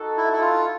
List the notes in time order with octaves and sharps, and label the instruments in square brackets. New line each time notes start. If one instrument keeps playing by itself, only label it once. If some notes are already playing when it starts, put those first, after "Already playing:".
Already playing: [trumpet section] D#4 F#4 A4
[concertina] E4
E4
F4